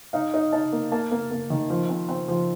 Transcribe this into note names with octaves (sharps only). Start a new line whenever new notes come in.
D#4 F5
D#4
D#4 A5
A#3
A#3 A5
A#3
A#3
D#3
F3
C4
C4
F3